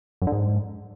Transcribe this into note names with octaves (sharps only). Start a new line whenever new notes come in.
F#2
D3
G#2